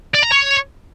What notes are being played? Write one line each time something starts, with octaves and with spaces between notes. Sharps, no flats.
D5
A#5
C#5